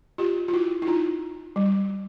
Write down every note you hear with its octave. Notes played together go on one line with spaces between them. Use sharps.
F4 G4
F4
E4 F#4
E4
D#4 F4
G3